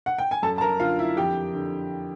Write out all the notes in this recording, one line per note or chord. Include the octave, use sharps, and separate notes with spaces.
F#5
G5
G#5
F#2 A4 A5
A5
A#4 A#5
D3 F4 F5
E4 E5
F2 G4 G5
D3